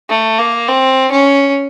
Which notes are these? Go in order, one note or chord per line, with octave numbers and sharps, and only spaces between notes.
A3
A#3
C4
C#4